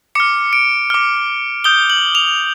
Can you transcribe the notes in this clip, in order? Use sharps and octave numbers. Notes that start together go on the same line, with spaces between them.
D6 F6 C#7
D7
D6 F6
D#6 G6 G7
F#7
F7